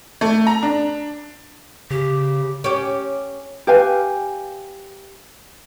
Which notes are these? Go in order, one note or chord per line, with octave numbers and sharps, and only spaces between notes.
A3
A#5
D4
C#3 G4
C#4 G4
G4 B4 F5 G#5